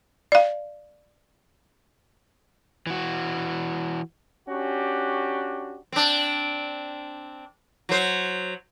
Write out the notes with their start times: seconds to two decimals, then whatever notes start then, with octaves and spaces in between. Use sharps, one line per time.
0.32 D5 F5
2.87 E3 F#4
4.49 C#4 D4 F#4 G4
5.92 C4 D4
7.89 F#3 C5